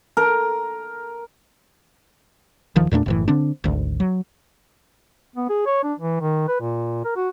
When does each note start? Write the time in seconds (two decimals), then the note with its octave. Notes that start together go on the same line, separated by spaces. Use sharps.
0.17 A#4
2.76 D#1 D#3 F3
2.91 E2 A#2 A3 D4
3.06 F#1 A2 E3
3.28 D3 C4 D4
3.64 G#1 D2
4.00 F#3
5.36 B3
5.49 G#4
5.66 C#5
5.83 D4
5.99 E3
6.21 D#3
6.48 B4
6.60 A#2
7.05 A#4
7.16 F#4